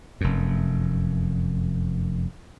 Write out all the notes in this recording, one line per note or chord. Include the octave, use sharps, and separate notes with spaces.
F1 F#2